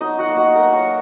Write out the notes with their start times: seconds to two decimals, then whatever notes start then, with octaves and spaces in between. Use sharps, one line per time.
0.01 F#3 D#4 D#5
0.19 F#4 F#5
0.28 A#3
0.37 F#4 F#5
0.55 F#3 A#4 A#5
0.73 C#5 C#6
0.82 F#3